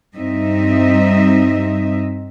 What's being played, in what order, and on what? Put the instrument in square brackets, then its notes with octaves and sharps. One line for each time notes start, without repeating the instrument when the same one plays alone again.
[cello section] G2 G3 C4 D#4 D#5 E5